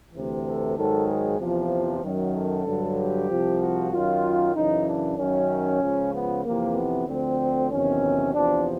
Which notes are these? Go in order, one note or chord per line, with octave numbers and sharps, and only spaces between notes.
D2 C3 E3
A4
G#2 D#3 F#3 A4
G#4
E2 C3 F3
F#2 D#3 F#3
A4
G2 D3 F#3
G4
C2 C3 F3
F#4
F#2 D#3 F#3 F4
F#2 C#3 E3 D#4
D4
F#2 D#3 F#3 C#4
C#2 C#3 F3
B3
F2 C3 E3 A#3
B3
D2 D3 F3 C4
E2 C3 D#3 F#3 C#4
E2 C3 F3 D4